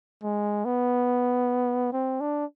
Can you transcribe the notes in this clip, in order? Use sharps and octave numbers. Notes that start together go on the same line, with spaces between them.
G#3
B3
C4
D4